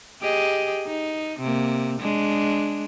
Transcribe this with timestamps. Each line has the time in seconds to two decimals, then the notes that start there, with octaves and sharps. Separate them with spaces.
0.22 G4 G#4 D#5
0.87 D#4
1.40 C3 A#3
2.00 G#3 D4